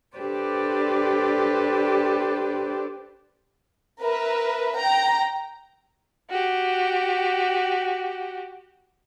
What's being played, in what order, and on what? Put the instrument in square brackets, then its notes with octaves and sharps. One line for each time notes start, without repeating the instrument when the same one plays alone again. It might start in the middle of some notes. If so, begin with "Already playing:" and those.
[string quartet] D4 G4 A4 B4 C5 D5
[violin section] A#4 B4 E5
G5 A#5
[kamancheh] F#4 G4